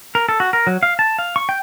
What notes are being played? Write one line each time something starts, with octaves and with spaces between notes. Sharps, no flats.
A#4
A4
F#4
A#4
F#3
F5
A5
F5
C#6
G5